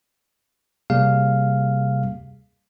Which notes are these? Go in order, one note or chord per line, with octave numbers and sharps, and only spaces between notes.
C3 G3 A#3 G#4 F5